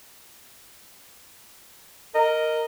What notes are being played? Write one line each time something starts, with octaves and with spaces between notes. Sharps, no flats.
A#4 D#5